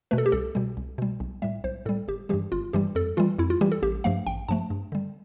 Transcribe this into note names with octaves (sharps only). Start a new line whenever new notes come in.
B2 A3 B4
A4
G4
C2 A4
B2 G3
C2
B2 G3
B1
A2 G3 E5
B1 C5
A2 G3 A4
G1 G4
G2 E3 G3 G4
G1 F4
G2 E3 G3 G4
F2 A4
E3 G3 F4
F2 E4
F4
E3 G3 G4
A4
A1 G4
G2 F3 A3 F5
A1 G5
G2 F3 A3 A5
G2
D3 G3